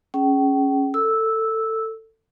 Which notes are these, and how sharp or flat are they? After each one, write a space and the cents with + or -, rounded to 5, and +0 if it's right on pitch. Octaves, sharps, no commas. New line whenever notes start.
C#4 -5 G#4 +5 G5 -40
A4 +20 E6 -5